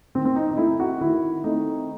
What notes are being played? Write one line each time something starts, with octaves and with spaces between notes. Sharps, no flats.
D#3 C4
C4
D#4
D#4
A3 C4 E4
F#4
D#3 E4
A3 C4 D#4